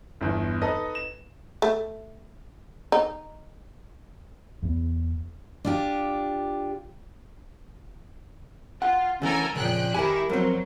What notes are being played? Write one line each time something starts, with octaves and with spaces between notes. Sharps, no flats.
G1 E2
D#4 A4 B4 D#5
E7
A3
D#4
E2 B3
D4 F4 G4
F4 F#5
D2 E3 C#4 A4 A#4 G#5
F2 A#2 C#3 G5 F#6
D#3 E4 G4 A#4 G#5
F2 F#3 C4 A#4